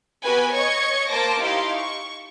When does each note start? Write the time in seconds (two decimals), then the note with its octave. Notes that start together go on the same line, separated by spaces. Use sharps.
0.24 B3 F#4 G4 B4 G#5
0.53 C#5 D#5 C#6 G#6 C#7
1.08 A#3 C5 A5 D6 A#6
1.41 D#4 E4 G4 F5 C6
1.76 C#6